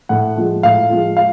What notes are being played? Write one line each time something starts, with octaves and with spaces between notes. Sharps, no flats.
A2 F#5
F3 G#3
A2 F5
F3 G#3
F5